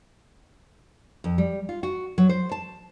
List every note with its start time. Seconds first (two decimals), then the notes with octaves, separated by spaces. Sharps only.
1.24 F2
1.38 G3
1.69 F4
1.83 F#4
2.18 F#3
2.29 C5
2.52 A5